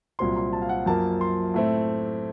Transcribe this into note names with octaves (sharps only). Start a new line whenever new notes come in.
C2 A#2 F#3 C4 C6
C6
A5
F5
F#5
F#2 F3 A#3 A5
C6
A2 A3 C4